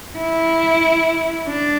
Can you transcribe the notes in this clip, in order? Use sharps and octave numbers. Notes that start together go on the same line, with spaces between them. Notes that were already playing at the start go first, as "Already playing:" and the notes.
E4
D4